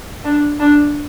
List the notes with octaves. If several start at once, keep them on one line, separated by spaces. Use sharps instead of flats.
D4
D4